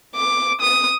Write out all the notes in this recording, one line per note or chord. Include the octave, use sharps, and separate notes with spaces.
D6
D#6